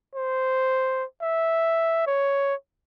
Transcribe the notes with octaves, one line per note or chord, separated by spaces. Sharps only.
C5
E5
C#5